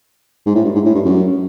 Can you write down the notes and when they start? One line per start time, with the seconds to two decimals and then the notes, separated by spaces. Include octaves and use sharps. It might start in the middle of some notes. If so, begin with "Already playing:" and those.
0.46 G#2
0.55 A2
0.65 G2
0.75 G#2
0.85 A2
0.95 G2
1.05 F#2